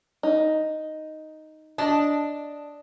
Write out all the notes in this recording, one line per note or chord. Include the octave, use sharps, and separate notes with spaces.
D#4
D4 D#5 A5